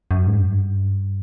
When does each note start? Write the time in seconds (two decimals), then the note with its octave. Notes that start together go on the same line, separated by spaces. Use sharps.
0.11 F#2
0.27 G#2
0.39 G2